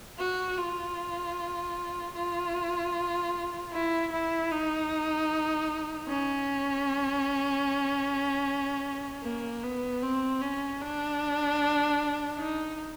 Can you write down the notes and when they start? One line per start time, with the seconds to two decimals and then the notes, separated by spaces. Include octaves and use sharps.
0.19 F#4
0.58 F4
2.15 F4
3.73 E4
4.12 E4
4.51 D#4
6.08 C#4
9.23 A#3
9.63 B3
10.02 C4
10.41 C#4
10.80 D4
12.38 D#4